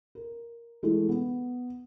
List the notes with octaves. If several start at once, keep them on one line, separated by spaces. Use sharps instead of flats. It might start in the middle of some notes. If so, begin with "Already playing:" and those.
A#4
E3 G#3 A3 E4
B3